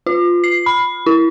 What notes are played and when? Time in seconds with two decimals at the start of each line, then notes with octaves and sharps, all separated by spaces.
0.06 F4
0.44 C7
0.66 B5
1.06 E4